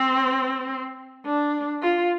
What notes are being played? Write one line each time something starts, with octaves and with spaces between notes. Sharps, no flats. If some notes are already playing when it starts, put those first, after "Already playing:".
Already playing: C4
D4
F4